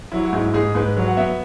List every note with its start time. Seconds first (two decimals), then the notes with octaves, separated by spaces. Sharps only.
0.12 F#3 E4
0.25 F#4
0.33 G#2 E4
0.54 G#2 G#4
0.75 G#2 B4
0.97 F#3
1.08 F#5
1.17 B3 E5